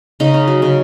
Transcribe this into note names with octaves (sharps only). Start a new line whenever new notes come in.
C#3 D#4
C#4
F#3
C#3